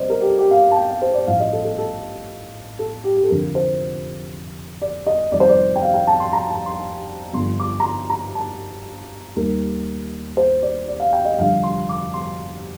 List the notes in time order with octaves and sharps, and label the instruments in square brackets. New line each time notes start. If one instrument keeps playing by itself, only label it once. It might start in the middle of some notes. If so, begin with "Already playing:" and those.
Already playing: [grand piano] C3 G3 C5 D5 D#5
A#4
G4
A4
G4
F5
A5
G5
F5
C5
D5
A1 A2 F3 F5
D#5
A4
A4
A4
A4
G4
G4
A4
F1 F2 D3 F3 A#4
C5
D5
D#5
F1 F2 D#3 G3 D5
C5
D5
G5
F5
G5
A5
C6
A#5
A5
C6
G1 G2 D3 F3 C6
D6
A#5
C6
A#5
A5
D#2 D#3 G3 A#4
C5
D5
D5
F5
G5
D#5
F1 F2 D3 G3 F5
C6
D6
C6